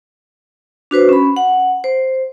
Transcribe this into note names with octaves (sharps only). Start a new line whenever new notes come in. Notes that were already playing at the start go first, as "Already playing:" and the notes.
D4 F#4 B4 C5
C#4 B5
F#5
C5